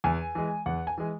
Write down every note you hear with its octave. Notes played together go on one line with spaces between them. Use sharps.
E2 G#5
E3 G#3
E2 F#5
G#5
E3 G#3